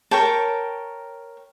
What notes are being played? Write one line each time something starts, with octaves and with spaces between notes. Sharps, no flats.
A#4 C#5 G5 A5